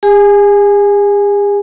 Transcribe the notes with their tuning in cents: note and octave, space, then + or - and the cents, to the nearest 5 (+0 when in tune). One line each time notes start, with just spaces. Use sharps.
G#4 -45 G#5 +0